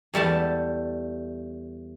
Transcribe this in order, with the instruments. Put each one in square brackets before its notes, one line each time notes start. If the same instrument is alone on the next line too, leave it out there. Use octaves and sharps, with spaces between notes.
[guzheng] E2 G3 A3 A5